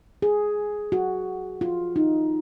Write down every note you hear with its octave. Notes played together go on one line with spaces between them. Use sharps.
G#4
F#4
F4
D#4